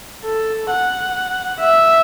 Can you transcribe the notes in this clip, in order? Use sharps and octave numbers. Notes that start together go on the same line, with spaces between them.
A4
F#5
E5